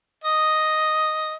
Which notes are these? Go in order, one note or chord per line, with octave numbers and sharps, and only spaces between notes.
D#5